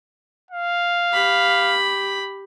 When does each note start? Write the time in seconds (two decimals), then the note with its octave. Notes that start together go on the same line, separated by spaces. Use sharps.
0.51 F5
1.12 G4 B5